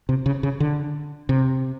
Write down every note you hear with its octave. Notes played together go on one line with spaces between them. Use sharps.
C3
C#3
C#3
D3
C3